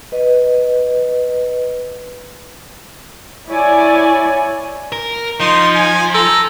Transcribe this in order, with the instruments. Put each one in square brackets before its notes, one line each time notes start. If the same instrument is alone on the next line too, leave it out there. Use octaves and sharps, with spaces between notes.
[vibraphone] B4 D#5
[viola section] E4 C#5 D5 G#5
[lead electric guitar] A#4
[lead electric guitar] F3 [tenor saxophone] D#4 [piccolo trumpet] C6
[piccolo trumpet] G#5
[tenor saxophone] A4 [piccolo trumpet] A#5